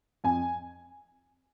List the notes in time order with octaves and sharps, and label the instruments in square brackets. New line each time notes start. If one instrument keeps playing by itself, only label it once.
[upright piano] F2 G#5